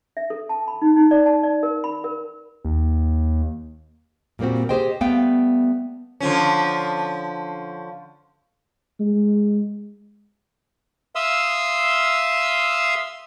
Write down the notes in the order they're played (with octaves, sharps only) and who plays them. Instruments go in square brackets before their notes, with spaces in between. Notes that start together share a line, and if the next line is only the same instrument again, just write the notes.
[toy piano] E5
A4
A5
B5
D#4
D#4
D5
A5
D5
A#4
B5
A#4
[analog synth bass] D#2
[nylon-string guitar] A#2 G3 A#3 C4 F#4
G4 G#4 C5 D#5 G5
G3 A3 B3 F5 G5
[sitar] D3 F3 C#4
[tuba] G#3
[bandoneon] E5 F5 C6 D#6 E6